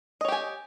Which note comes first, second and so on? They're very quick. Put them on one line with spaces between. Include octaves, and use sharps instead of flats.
D#5 C#5 G4 G#5